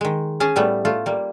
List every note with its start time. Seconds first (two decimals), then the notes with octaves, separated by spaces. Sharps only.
0.01 D#3 G#3
0.40 C#4 G#4 G#5 A5
0.56 A2 G3 A3 B3
0.85 A3 F4
1.06 G3 A#3